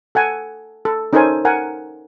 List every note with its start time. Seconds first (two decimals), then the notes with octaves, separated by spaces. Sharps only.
0.15 A4 F#5 G#5
0.85 A4
1.13 C#4 D#4 A4 A#4 C5 G#5
1.45 A#4 F#5 G#5